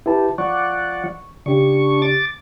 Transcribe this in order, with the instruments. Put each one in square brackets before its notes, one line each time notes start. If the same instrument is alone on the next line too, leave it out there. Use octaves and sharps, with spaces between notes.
[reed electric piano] E4 B4 A5 [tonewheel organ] G4
[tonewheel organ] F3 D5 F#5 [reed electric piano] C#6
[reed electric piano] C#3 G4 [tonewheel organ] D4 C#6
[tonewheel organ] D6 A6